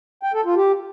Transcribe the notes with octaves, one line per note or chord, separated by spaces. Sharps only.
G5
A4
F4
G4